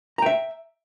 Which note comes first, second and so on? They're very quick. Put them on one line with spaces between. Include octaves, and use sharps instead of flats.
A#5 G5 E5